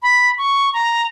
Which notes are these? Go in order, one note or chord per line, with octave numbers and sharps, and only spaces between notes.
B5
C#6
A#5